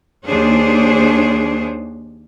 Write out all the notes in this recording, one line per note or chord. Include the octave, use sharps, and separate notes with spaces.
D#2 D4 G#4 C5 C#5